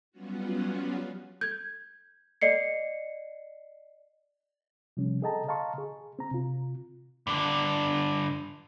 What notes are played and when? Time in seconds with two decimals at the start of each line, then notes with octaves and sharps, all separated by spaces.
0.11 F#3 G3 B3 C#4 F4 F#4
1.41 G6 G#6
2.41 D5 D#5 C7 C#7
4.97 C3 F3 G3 C#4
5.22 G#4 A4 D#5 G5 A5 A#5
5.48 D#5 F5 A5 A#5 C6 C#6
5.78 G#4
6.19 C4 A#5
6.32 C3 F4
7.27 G2 D3